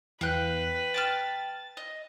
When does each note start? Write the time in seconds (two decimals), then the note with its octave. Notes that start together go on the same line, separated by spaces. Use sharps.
0.21 E2 B4 F5 G5 F#6
0.94 G5 A5 F6 A6
1.77 D#5